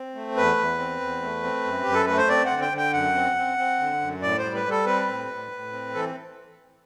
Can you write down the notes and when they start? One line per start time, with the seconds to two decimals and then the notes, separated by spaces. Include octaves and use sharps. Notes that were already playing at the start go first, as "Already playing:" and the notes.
Already playing: C4
0.15 A3
0.37 E2 B4
0.57 E2
0.78 C4
1.01 E2
1.22 A3
1.43 C4
1.64 F#2
1.83 F#2 G4
1.94 A4
2.06 A3 B4
2.17 C5
2.29 C4 D5
2.45 F#5
2.50 D3
2.62 G5
2.72 D3 G5
2.93 F#2 F#5
3.15 C4
3.36 C4
3.58 C4
3.79 D3
4.01 F#2
4.22 A2 D5
4.38 C5
4.44 G3
4.55 B4
4.66 G3 A4
4.86 C4 B4
5.08 A2
5.30 A2
5.52 A2
5.73 C4
5.94 E3 A4